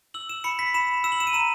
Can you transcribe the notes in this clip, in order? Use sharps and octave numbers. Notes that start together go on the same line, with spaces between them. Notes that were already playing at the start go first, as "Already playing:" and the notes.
E6 F#7
E7
B5 C#7
B6
B5 E7
E6 E7
F#7
E7
D#7
A#5 E7